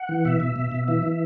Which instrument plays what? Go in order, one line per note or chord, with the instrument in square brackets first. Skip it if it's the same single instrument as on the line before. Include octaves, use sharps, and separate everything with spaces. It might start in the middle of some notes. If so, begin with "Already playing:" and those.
Already playing: [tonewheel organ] F#5
E3
B2 E5
B2
B2
B2
E3 E5
E3